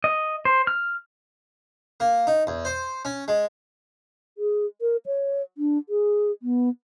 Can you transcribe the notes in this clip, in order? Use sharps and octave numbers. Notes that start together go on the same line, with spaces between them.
D#5
C5
F6
A#3
D#4
E2
C5
C#4
G#3
G#4
A#4
C#5
D4
G#4
B3